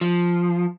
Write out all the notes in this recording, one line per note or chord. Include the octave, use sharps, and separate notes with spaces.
F3